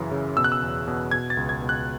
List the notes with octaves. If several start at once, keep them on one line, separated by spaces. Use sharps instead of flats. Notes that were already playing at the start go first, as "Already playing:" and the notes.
Already playing: F#2 C#3 E3
C#3
B2 E6
F#6
E6
E2
B2
B2 G#6
A6
C#2
G#6
B2
F#6